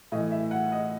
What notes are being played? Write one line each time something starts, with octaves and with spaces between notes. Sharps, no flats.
A2 E3 D#5
E5
F#5
D#5